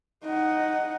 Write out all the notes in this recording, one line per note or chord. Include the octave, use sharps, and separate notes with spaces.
D#4 F#5